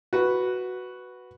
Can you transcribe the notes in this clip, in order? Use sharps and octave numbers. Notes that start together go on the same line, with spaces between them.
F#4 B4